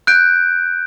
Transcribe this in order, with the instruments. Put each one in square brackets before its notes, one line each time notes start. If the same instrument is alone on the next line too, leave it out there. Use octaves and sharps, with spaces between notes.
[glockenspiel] F#6 G6 D7